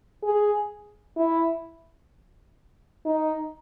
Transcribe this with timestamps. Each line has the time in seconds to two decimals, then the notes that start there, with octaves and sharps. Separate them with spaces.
0.23 G#4
1.17 E4
3.05 D#4